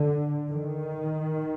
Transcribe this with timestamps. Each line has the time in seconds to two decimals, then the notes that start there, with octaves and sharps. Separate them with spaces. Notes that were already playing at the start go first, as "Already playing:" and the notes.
Already playing: D3
0.50 D#3